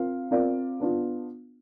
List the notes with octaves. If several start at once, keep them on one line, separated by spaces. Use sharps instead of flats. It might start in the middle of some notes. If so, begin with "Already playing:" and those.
Already playing: C4 F4 A#4 F5
C4 F4 A#4 D5 F5
B3 D4 F4